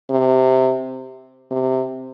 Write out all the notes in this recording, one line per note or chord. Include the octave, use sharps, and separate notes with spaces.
C3
C3